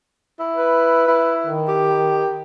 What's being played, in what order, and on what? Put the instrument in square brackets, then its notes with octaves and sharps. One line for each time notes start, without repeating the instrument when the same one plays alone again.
[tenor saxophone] E4
[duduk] B4
[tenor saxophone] E4
[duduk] D#3
[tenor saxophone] G4